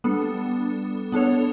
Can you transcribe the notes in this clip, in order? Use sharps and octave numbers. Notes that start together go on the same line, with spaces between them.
G3 B3 D4 A4
B3 D4 A4 C#5